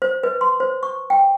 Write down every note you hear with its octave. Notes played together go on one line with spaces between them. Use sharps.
C5
B4
C6
C5
C#6
G5